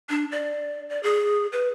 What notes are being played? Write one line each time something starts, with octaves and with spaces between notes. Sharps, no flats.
D4
D5
D5
G#4
B4